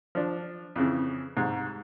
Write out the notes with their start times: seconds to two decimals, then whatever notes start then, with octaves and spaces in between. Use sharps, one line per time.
0.15 F3 D4
0.76 F2 C#3 E3
1.37 C2 G#2